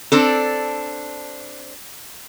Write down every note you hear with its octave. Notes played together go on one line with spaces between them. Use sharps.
C4 D4 A4